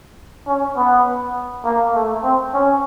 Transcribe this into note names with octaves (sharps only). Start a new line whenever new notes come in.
C#4
B3
A#3
A3
C4
C#4